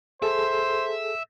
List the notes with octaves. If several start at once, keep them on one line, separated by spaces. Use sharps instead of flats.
G#4 A4 C5 E5